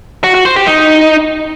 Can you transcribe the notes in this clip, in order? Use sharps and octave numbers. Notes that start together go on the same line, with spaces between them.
F#4
F#4
C5
G4
D#4